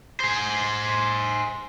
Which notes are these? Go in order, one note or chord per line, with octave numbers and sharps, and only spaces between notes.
G#4 C5